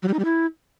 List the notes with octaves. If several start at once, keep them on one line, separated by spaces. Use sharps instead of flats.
F#3
G3
D#4
G3
E4